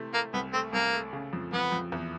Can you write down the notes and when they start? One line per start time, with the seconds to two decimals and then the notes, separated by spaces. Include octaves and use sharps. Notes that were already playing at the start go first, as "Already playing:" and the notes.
Already playing: C3 E3 A3
0.14 A3 A#3
0.33 C2 B3
0.53 A3 C4
0.73 C2 A#3
0.93 A3
1.13 C#3
1.33 F2
1.53 F2 B3
1.72 F2
1.92 E2